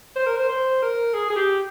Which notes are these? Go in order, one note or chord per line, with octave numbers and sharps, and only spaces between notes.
C5
A#4
C5
C5
A#4
G#4
G#4
G4